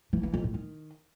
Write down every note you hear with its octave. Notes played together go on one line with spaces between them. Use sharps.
E3
E3
F2
A2
D#3